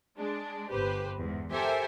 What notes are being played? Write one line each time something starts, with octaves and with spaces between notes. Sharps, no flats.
G#3 D4
G1 G4 B4 C5
E2 G#2
G4 A4 A#4 C5 E5 G#5